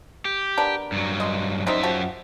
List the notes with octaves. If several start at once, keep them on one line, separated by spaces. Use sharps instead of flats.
G4
B3 D4 A#4
G2 F#3
D#5 C6
F#2 G3 C4 D#4 E5
F3 F#4 G4